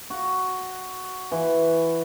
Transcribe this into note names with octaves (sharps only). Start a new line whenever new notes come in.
F#4
E3